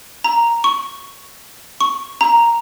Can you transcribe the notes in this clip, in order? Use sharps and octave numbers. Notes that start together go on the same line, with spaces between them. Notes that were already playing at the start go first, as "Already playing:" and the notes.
A#5
C#6
C#6
A#5